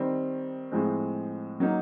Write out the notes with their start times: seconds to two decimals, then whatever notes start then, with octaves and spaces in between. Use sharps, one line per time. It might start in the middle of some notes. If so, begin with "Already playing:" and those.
Already playing: D#3 G3 C4
0.71 A2 F3 G#3 C4
1.60 F#3 A#3 D#4